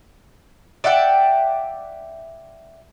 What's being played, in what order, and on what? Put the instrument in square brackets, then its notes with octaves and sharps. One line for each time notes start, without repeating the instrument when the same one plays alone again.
[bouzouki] D5 E5 F#5 G5